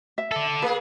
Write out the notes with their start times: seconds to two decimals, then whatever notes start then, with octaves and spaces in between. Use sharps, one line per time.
0.18 E5
0.31 A4 D5
0.62 A#3 G#4 B4